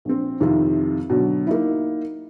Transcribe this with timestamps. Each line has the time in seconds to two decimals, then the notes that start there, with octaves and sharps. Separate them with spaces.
0.05 A#1 C4
0.40 F2 C3 D#3 E4 F4
1.10 B2 D3 F#3
1.47 A#3 D#4 E4